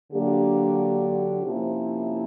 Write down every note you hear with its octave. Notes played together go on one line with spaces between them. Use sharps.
D3 F#3 A#3 D4 G4
C3 F3 A#3 C#4 E4